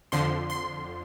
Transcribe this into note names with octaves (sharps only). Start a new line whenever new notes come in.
F2 D3 F3 C6
C6